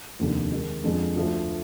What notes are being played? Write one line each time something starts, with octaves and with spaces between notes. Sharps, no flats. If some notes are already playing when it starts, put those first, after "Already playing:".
F1 D#2 D3
D#3 G#3 D#4
F2 D3 F3 G#3
D2 D3 F3